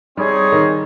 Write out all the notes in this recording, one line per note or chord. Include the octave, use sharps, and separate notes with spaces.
G3 C4 D#4 G#4 C#5
D#3